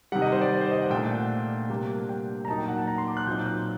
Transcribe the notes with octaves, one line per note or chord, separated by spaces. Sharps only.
C3 D#3 G3 F#5
D#5
C5
D5
D5
C5
D#5
F#5
A#2 A3 D4 G5
F#5
C3 G3 A#3 D4
G5
A#5
A#2 F#3 A#3 D#4 A5
G5
F#5
A5
A#5
C6
D6
F#6
A#2 F#3 C4 D#4 G6
F#6